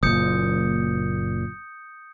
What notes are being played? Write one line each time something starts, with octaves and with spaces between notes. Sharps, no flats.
F#1 A#2 D#6 G6 C#7